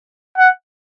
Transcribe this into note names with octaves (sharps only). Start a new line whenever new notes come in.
F#5